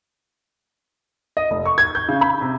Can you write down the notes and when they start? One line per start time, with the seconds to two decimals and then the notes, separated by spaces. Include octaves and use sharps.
1.37 D#5
1.51 F1
1.65 C#6
1.78 G#6
1.95 G6
2.09 C#3
2.21 B5
2.41 C3